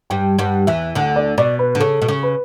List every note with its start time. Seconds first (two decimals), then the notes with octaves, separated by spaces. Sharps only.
0.10 G2 G3 G5
0.39 G2 G3 F#5
0.67 E2 E3 E5
0.95 D2 D3 F#5
1.16 D5
1.38 B2 D5
1.59 B4
1.75 D3
1.80 C#3 A4
2.02 B2
2.08 C#3
2.23 B4